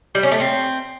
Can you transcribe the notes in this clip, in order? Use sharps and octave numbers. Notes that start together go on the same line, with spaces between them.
G3
C#4
A3
C4